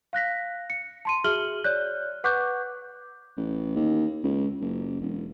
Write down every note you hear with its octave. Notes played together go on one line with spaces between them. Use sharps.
F5 F#6 A#6 B6
C#7
A5 C6 D#7
F#4 G#4 E5 F6 F#7 G7
C#5 D5 F#6 G6
B4 F#5 C#6 D6 F#6 G6
A1
D#2
C#2
F#1
E1